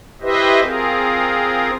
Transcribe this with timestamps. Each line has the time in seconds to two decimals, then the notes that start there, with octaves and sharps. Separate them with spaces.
0.21 E4 G4 B4 C5 D#5 E5
0.61 C4 F4 G#4 A#4